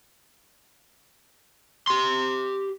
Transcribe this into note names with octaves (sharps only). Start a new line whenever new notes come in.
G4 C6